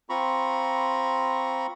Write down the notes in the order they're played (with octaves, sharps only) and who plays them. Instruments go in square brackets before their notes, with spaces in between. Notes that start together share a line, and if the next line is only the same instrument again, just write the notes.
[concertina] C4 F4 A#5 B5 C#6